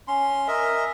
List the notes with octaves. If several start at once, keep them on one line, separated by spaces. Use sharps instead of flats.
C#4 C6
A#4 D#5 E5